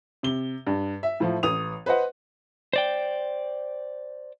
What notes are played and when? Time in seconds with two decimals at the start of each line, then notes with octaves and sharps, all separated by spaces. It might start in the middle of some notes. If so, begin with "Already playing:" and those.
0.23 C3 G7
0.67 G2
1.03 E5
1.20 A2 F3
1.43 A1 D#6 F7
1.86 B4 C5 D#5 F#5
2.73 C5 D5 G5